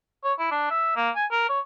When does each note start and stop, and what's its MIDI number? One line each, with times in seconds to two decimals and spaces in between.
0.24 0.33 73
0.39 0.51 64
0.51 0.70 62
0.70 0.94 76
0.96 1.10 58
1.16 1.26 80
1.31 1.46 70
1.49 1.60 73